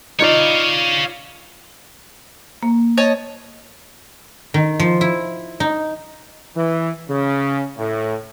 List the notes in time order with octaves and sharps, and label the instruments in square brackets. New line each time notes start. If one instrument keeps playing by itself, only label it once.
[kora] D#4 F4 D5 [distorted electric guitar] C#5 F5
[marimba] A#3
[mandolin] C#5 D#5 A5
[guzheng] D#3
F3
E4
D#4
[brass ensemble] E3
C#3
A2